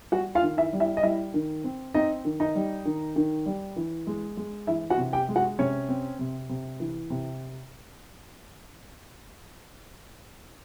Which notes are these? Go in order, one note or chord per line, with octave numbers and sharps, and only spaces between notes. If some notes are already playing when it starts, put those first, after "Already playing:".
G3 F#4 F#5
F4 F5
D#3
E4 E5
G3
E4 E5
D#5
G3 E4 E5
D#3
C4
C4 D#4 D#5
D#3
D#4 D#5
G3
D#3
D#3
G3
E3
G#3
G#3
E3 E4 E5
F#4 F#5
C3
G4 G5
G#3
F#4 F#5
C3 C#4 C#5
C4
C3
C3
E3
C3